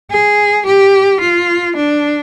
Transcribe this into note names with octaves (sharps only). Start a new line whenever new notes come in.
G#4
G4
F4
D4